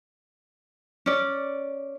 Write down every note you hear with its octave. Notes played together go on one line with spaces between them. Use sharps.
C#4 D5